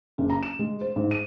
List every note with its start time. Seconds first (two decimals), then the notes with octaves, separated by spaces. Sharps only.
0.18 F#1
0.30 A#5
0.43 E7
0.59 G#3
0.81 C5
0.96 G#2
1.11 D#7